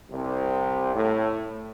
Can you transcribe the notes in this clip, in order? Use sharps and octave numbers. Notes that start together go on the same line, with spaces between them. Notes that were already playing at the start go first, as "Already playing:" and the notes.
C2 C3
A2